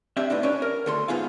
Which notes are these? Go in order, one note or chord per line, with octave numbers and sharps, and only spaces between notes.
C4 D4 G4 E5
A2 B3 D4 D#4
C#4 D4 C#5
A#4
D2 A4 C6
G#2 B3 F4 G#4 F5